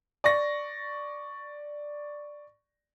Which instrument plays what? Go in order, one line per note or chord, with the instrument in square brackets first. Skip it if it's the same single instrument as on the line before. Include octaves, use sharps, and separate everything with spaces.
[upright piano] D5 C#6 A#6